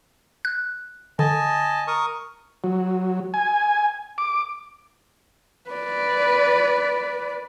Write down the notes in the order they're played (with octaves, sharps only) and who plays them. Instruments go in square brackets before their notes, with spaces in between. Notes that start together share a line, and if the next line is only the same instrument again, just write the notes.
[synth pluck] F#6
[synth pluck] D3 [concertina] D#5 G#5 A5
[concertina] A#4 C#6 D#6
[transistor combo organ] F#3
G#5
D6
[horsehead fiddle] B4 D5